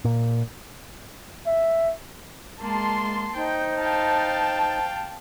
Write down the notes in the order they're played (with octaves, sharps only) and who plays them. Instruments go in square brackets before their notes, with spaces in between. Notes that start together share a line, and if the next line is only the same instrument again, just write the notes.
[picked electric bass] A#2
[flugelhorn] E5
[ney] G#3 [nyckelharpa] A#3 [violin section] A5 C6
[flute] D#4 [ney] C5 [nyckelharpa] G5
[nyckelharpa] F5 G5 [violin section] A5